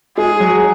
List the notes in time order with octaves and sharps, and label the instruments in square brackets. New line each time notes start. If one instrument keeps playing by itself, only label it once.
[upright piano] G#3 [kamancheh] G#4
[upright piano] F#3